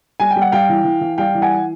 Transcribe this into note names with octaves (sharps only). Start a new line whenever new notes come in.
G3 G#5
G5
G3
F#5
G3 F5 G5
E3
E3
E3
G3 F5 G5
E3
F#5 G#5